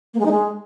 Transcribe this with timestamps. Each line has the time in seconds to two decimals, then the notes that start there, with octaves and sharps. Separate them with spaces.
0.14 A#3
0.20 G#3
0.25 D#4
0.31 G#3